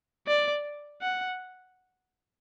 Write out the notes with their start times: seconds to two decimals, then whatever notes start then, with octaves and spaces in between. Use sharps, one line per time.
0.27 D5
1.02 F#5